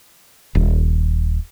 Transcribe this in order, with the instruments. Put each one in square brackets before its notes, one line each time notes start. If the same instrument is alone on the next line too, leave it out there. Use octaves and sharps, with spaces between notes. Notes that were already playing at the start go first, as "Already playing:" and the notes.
[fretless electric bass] D#1